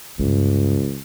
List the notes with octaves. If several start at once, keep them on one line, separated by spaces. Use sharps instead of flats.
C#2 G2 C3